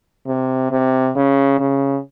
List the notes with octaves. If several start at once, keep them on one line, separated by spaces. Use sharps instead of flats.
C3
C3
C#3
C#3